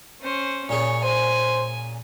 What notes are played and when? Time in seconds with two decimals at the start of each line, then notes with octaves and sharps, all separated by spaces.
0.21 C#4 C5
0.69 A#2 C#4 G#4 C#5
1.03 C5 G#5